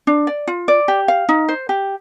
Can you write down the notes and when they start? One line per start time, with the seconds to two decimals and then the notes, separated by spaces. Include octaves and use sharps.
0.07 D4
0.27 D5
0.47 F4
0.68 D5
0.88 G4
1.08 F5
1.29 D#4
1.48 C5
1.69 G4